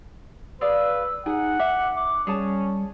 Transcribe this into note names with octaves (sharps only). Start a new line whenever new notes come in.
G#4 B4 D5 F5 E6
D#4 G#4 F#5
E5 D6
D6
G3 C#4 G#4 C#5 A5